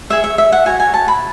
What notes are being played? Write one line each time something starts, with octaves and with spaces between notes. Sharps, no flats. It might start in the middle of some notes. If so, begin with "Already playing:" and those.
G#4 C#5 E5
E5
E5
F#5
F#4 C#5 G#5
G#5
A5
B5